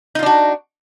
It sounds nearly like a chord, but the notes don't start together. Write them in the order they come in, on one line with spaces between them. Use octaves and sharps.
D#4 F4 D4 F#4